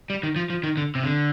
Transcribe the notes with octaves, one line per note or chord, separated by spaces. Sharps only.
G3
D#3
F3
F3
D#3
D3
C3
D3